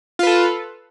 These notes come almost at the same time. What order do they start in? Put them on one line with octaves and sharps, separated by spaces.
F4 B4 A4